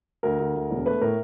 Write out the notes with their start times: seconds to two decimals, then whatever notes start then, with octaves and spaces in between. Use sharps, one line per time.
0.23 D2 A#4
0.39 D2
0.55 D2
0.71 E1
0.86 A3 B4
1.01 A2 A#4